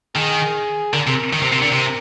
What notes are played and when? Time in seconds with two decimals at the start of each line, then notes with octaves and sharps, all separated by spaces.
0.15 D#3 G#4
0.93 D3 A#4
1.07 C3
1.33 D#3
1.42 C3
1.52 C3
1.62 D3
1.72 C3